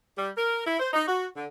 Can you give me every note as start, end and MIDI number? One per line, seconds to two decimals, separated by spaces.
0.17 0.29 55
0.36 0.63 70
0.65 0.79 64
0.79 0.89 72
0.93 1.02 63
1.08 1.27 66
1.36 1.45 50